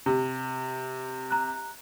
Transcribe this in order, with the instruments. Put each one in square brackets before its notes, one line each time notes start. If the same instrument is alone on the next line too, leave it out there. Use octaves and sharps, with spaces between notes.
[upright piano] C3
[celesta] A#5 F#6